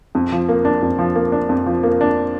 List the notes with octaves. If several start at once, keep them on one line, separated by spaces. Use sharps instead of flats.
F2
F3
A#3
D4
F2
F3
A#3
D4
F2
F3
A#3
D4